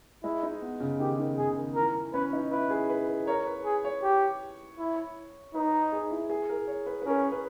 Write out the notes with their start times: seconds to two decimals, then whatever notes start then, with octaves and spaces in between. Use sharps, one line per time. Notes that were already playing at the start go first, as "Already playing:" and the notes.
0.24 G#3 E4
0.43 D#4
0.62 B3
0.80 C#3
1.00 D#3 G4
1.19 D#3
1.38 C#3 G#4
1.57 D#3
1.75 E3 A#4
1.94 E3
2.13 C#4 B4
2.33 D#4
2.51 E4 B4
2.70 G#4
2.89 B4
3.08 B4
3.27 A#4 C#5
3.46 B4
3.65 G#4
3.85 C#5
4.03 G4
4.79 E4
5.54 D#4 B4
5.92 G#4
6.11 E4
6.30 G#4
6.49 A#4
6.68 C#5
6.86 B4
7.02 B4
7.06 C#4 A#4
7.32 B4